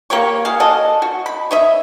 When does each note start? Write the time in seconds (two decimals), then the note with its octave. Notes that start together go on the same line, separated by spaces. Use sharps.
0.10 A#3 G4 C#5 C#6
0.45 F#4 G#4 F5
0.60 F#4 A4 D#5
1.02 F#4
1.26 B5
1.51 C#5 D#5 E5